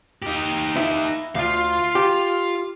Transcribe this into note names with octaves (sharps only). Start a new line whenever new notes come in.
D#4 G4
E4
D2 F4 F5
G4